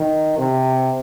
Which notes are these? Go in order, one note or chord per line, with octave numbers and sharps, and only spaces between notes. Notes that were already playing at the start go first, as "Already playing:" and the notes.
Already playing: D#3
C3